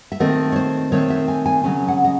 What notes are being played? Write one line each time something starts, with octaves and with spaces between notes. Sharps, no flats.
E5
D#3 A3 C4 D#5
C#5
C5
D#3 A3 C4 C#5
E5
G#5
G#5
C#3 F#3 C#4 G#5
F#5
D#5